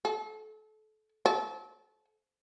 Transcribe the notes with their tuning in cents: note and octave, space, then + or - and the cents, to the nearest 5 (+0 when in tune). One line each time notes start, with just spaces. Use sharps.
A4 -30
A4 -35